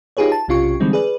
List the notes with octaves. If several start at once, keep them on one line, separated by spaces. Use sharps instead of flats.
D#4 F4 G4 G#4 B4 C#5
A5
B1 C3 C#4 F4 G4 C#6
D3 E3 G3 G#3 C4 D#4
G#4 B4 D5